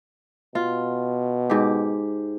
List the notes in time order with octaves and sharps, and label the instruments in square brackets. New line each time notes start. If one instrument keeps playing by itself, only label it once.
[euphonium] B2 [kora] F4
[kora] G#2 G4